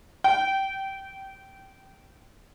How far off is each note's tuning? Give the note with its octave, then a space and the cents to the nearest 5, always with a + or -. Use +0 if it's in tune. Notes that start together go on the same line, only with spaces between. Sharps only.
G5 -20